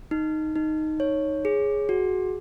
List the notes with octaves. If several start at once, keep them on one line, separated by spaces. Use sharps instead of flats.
D#4
D#4
C#5
G#4
F#4